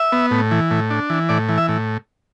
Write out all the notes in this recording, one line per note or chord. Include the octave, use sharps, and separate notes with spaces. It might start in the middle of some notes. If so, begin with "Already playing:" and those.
Already playing: E5
B3
A2
E3
A2
D4
E3
A2 D5
E3
E5
A2